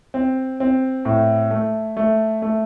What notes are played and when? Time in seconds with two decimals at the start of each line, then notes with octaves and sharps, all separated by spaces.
0.14 C4
0.60 C4
1.05 A2
1.51 A3
1.97 A3
2.42 A3